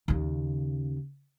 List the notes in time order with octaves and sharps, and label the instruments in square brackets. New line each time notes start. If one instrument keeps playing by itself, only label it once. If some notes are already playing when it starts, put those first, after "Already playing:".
[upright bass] D#2 C#3